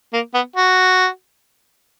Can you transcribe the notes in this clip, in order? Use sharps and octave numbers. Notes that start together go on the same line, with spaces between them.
A#3
B3
F#4